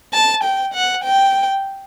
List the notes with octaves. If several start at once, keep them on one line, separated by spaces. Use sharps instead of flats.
A5
G5
F#5
G5